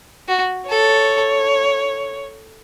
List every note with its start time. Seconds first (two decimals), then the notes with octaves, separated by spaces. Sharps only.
0.28 F#4
0.70 A4 C#5